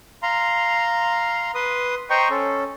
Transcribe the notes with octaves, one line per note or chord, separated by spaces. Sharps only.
F5 A#5 C6
B4 C6 D#6
C5 D#5 G5 A#5 C6 C#6
C#4 A4